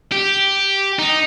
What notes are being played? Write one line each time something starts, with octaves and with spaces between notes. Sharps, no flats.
G4
D#4